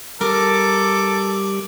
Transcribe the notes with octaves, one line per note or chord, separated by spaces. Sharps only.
G3 G4 A4 A#4 D6